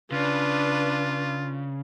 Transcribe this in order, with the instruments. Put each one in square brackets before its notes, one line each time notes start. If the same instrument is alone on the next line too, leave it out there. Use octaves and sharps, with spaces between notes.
[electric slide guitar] C#3 [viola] D4 B4 [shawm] F4